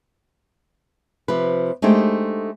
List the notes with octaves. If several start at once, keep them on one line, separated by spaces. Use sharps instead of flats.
C3 F3 B4
G#3 A3 D4 D#4 G4 C5